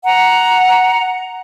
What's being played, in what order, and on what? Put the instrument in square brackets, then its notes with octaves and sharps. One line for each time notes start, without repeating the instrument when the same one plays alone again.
[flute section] F#5 A#5